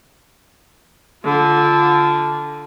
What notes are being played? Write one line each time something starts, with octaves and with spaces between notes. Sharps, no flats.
D3 F4